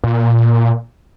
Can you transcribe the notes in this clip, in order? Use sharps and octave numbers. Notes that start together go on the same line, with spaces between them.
A#2